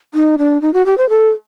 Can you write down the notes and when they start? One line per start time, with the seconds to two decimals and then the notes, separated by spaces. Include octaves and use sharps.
0.14 D#4
0.38 D4
0.62 D#4
0.74 F#4
0.86 G4
0.98 C5
1.09 A4